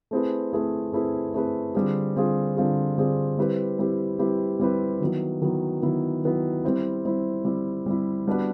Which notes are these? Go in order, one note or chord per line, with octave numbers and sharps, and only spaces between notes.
A3 C4 E4 G#4 B4
A3 C4 E4 G#4 B4
A3 C4 E4 G#4 B4
A3 C4 E4 G#4 B4
D3 G3 C4 F4 G#4
D3 G3 C4 F4 G#4
D3 G3 C4 F4 G#4
D3 G3 C4 F4 G#4
G3 C4 E4 G4 B4
G3 C4 E4 G4 B4
G3 C4 E4 G4 B4
G3 C4 E4 G4 B4
D#3 F#3 B3 E4
D#3 F#3 B3 E4
D#3 F#3 B3 E4
D#3 F#3 B3 E4
G3 C4 E4
G3 C4 E4
G3 C4 E4
G3 C4 E4
G3 B3 D4 F#4 B4